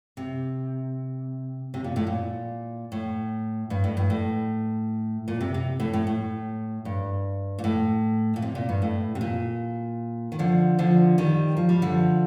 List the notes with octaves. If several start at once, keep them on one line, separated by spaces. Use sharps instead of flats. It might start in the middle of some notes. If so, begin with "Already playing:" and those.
C3
C3
A#2
A2
A#2
A2
G2
A2
G2
A2
A#2
C3
C3
A2
A2
A2
G2
A#2
A2
A#2
C3
A#2
G2
A2
C3
A#2
D#3
D3 F3
D3 F3
D#3 G3
F3
G3
D3 F3